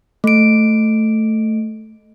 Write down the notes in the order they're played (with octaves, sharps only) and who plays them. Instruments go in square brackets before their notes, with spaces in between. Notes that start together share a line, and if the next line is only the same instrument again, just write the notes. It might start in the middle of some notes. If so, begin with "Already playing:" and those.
[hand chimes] A3 D7